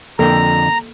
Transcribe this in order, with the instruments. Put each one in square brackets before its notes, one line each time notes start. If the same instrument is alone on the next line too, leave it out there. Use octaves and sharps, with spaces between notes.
[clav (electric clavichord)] F2 D3 G5 [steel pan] A#3 A4 [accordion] A#5